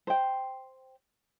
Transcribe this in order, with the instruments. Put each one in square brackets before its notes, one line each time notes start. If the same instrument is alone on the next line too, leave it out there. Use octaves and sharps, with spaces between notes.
[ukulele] C5 G5